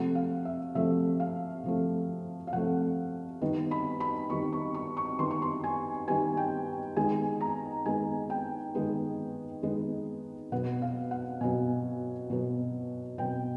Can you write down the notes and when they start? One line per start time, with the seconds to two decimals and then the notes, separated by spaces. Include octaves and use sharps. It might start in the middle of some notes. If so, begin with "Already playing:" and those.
Already playing: C3 F3 A3 F#5
0.15 F5
0.45 E5
0.75 C3 F3 A3 E5
1.20 F5
1.64 C3 F3 A3
2.47 F5
2.53 C3 F3 A3 F#5
3.42 D#3 G3 B3
3.71 B5
4.00 B5
4.30 D#3 G3 B3 C#6
4.53 C#6
4.74 C#6
4.97 C#6
5.19 D#3 G3 B3 C6
5.31 C#6
5.42 C6
5.64 G#5
6.08 D#3 G3 B3 G#5
6.37 G5
6.97 D#3 G#3 B3 G#5
7.41 A#5
7.85 D#3 G#3 B3 G#5
8.30 G5
8.75 D#3 G#3 B3
9.63 D#3 G#3 B3
10.52 B2 F#3 B3 F#5
10.82 F5
11.11 F#5
11.41 B2 F#3 B3 G#5
12.30 B2 F#3 B3
13.18 B2 F#3 B3 G5